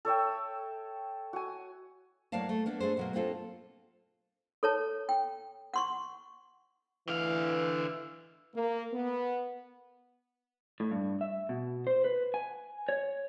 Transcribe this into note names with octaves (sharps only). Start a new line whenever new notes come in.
A4 C#5 E5 G5
F#4 G#5
A2 F#3 A#3 D5 F5 A5
A3
A#3 B3 D4
A3 D4 G#4 C5
B2 F#3 A#3
A#3 C4 D4 F4 A4
A4 C#5 A5
G5
F#5 C6 C#6
D3 E3 F5
A#3
B3
A2
G2
E5
B2
C5
B4
G#5
C#5